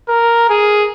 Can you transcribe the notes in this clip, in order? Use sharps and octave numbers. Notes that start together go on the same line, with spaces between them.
A#4
G#4